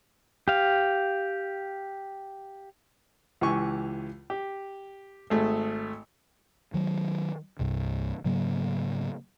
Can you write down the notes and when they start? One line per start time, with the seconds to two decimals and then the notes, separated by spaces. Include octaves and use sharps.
0.48 G4 F5
3.41 C#2 E3 G4 G#5 C#6
4.30 G4
5.30 G#1 A3 G#4 A4
6.74 D#3 F#3
7.59 C2 G2 C3
8.25 G#2 C#3 F#3 A#3